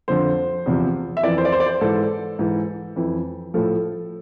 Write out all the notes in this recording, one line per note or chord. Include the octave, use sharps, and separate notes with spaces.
F2 D3 F3 C5
E2 C3 F3
E5
F2 E3 D5
C5
D5
C5
D5
C5
G#2 E3 A4
G#2 E3
F2 E3
A2 F3 A4